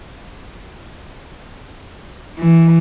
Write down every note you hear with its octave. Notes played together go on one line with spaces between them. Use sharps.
E3